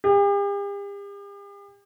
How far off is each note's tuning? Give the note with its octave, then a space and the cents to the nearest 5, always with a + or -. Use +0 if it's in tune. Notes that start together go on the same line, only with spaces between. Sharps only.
G4 +45